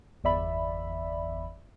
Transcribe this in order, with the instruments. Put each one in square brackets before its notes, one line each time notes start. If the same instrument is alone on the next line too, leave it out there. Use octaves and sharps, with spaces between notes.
[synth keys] G1 E2 D5 E5 B5